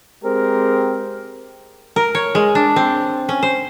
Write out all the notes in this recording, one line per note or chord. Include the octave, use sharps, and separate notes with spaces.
G#3 C4 G4 A#4
A#4
C#5
G#3
D4
C4
C#4
C5